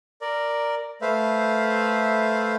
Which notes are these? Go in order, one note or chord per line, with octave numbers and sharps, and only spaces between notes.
A#4 D5
A3 B4 C5 E5 F5